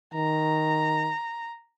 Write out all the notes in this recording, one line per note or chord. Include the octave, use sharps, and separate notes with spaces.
D#3 A#5